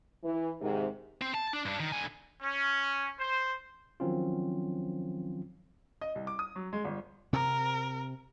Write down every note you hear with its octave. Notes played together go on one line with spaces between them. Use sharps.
E3
G#2 C3 D#3
C4
A5
D4
G2 D4
D#3
D3 G#5
C#4
C5
D#3 F3 F#3 C4 C#4 F4
D#5
C2
D6
D#6
F#3
G#3
G1
C3 C4 A#4